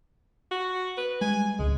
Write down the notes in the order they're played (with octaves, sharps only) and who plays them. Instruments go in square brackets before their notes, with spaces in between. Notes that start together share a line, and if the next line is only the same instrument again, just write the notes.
[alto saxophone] F#4
B4
[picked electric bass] G3 G#3 [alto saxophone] G#5
[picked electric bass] D1 G#1 C#2 [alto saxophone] G#3